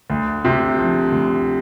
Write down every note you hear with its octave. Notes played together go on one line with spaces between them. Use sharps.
D2
C3
F3
D2